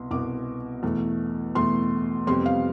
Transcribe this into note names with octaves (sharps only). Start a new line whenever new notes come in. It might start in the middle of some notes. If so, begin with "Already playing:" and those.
Already playing: C2 B2 B3 C6
C2 B2 B3 D6
E2 B2 A3
E2 B2 A3 C6
F2 C3 G3 B3 C6
F5